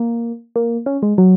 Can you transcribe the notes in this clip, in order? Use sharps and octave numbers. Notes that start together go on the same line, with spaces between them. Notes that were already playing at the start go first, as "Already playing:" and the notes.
Already playing: A#3
A#3
C#4
G#3
F#3